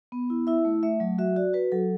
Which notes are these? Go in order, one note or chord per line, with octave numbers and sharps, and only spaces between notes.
B3
E4
E4 E5
A3
A3 E5
F#3
F#4 E5
F#4 D5
F#4 B4
F#3 A4